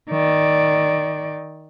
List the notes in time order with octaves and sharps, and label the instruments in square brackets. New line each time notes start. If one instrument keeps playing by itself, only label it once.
[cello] D#3 D5